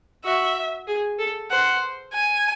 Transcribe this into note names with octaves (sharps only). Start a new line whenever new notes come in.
F#4 E5
G#4
A4
C5 F#5
G#5